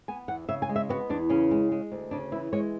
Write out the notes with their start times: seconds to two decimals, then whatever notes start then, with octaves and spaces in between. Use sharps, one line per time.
0.08 B3 G#5
0.28 E2 F#5
0.49 C#3 E5
0.62 G#5
0.69 G#3
0.76 E5
0.89 B3 F#4
1.10 E2 D4
1.30 C#3 C#4
1.51 G#3
1.72 G#3
1.92 D2
2.11 C#3 D4
2.32 E3 E4
2.53 G#3 C#5